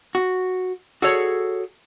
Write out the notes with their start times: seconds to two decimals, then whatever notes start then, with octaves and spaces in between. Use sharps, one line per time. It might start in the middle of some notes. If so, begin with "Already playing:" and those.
0.15 F#4
1.02 F#4 G#4 A4 C#5